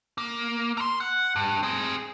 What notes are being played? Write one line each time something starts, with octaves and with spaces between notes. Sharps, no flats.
A#3
A#5 C6
F#5
G2
C4 G#4